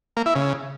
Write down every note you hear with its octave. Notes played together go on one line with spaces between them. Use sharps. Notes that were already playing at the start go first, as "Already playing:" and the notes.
A#3
E4
C#3